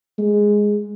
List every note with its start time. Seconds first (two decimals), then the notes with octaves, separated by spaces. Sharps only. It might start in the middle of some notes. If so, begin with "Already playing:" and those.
0.19 G#3